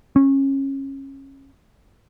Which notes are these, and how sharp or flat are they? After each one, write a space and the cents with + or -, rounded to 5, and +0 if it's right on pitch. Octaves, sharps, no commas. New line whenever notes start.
C#4 -25